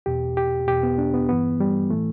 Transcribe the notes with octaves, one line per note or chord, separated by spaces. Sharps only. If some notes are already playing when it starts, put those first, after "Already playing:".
E2 B2 G4
G4
E2 B2 G4
B3
D4
B3
G2 E3 B3
G3
A2 E3 A3